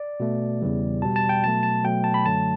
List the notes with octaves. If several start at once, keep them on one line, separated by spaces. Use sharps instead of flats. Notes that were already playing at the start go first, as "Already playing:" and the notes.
Already playing: D5
B2 A3
E2 C#3 E3 G3
B2 G3 A5
A5
G5
B2 F#3 A3 A5
A5
B2 F#3 A3 G5
A5
B5
F#2 D3 F#3 A3 A5